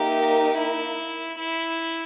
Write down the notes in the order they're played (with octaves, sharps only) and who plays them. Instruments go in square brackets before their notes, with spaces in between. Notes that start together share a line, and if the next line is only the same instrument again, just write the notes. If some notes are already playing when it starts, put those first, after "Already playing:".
Already playing: [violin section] A#3 D#4 A#4 E5 [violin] G4
[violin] E4
E4